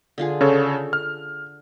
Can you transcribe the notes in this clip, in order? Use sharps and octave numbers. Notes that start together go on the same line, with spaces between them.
D3 F4 G#4
C#3 A4 C#5
F6